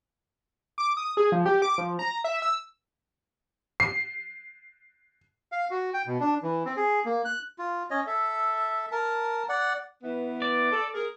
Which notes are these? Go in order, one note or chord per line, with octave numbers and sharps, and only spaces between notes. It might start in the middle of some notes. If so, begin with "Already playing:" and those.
D6
D#6
G#4
F3
G4
D6
F3
A#5
E5
E6
C7
F5
F#4
G5
B2
D4
E3
C4
G#4
A#3
F#6
F4
C#4 C#5 D#5
A4 E5
A#4 A5
D5 F#5
E3 B3
D5
A4
G#4 A#4